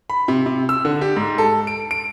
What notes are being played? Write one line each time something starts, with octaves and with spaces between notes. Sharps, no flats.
B5
C3
C3
E6
D3
G4
G#2
A4
D7
D7